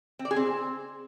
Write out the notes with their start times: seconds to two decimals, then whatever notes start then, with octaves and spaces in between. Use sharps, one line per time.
0.19 C4
0.25 D5
0.31 G#4
0.36 C4